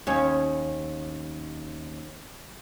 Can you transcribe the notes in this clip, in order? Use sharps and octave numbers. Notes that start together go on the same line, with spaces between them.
D#2 C#4